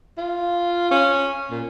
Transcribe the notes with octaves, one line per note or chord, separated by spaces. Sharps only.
F4
C#4
A#2